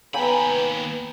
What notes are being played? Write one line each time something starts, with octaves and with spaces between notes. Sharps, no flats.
D#2 B3 B4 G5 G#5 A#5 B5